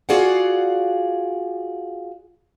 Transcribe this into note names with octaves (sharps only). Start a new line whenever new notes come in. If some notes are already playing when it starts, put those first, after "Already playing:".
F4 F#4 G#4 D5 F5 F#5